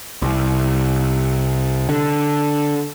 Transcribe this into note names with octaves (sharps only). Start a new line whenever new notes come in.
C2
D3